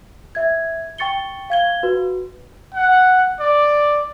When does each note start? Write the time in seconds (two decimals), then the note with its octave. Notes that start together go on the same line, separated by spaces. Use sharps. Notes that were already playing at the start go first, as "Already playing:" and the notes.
0.35 E5 G#6
0.98 G5 C#6 A6 C#7 G7
1.50 F5 G#6 G7
1.83 F#4 B4
2.74 F#5
3.40 D5